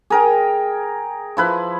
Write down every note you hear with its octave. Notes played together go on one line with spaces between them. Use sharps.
G#4 A#4 G5
F3 E4 B4